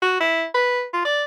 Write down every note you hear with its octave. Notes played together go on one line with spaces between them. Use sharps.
F#4
E4
B4
F4
D5